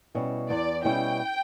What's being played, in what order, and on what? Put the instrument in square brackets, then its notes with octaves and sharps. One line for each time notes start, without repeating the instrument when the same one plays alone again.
[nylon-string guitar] B2 G3 C#4 E4
[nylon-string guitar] E2 [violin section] D5
[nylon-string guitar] B2 G3 C#4 E4 [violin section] G5